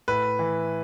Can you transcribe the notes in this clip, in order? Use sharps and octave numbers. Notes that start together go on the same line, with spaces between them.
A2 B4
E3